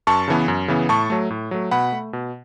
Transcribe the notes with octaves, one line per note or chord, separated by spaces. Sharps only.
F#2 A5 C#6
C#3 E3 B3
F#2
C#3 E3 B3
A2 A5 C#6
F#3 A3
A2
F#3 A3
B2 F#5 B5
A3
B2